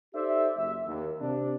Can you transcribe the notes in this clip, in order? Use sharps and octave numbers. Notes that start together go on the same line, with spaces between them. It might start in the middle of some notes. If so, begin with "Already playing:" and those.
D#4 G4 A4 C5 D5 E5
F#1 E5
D#2
C3 D4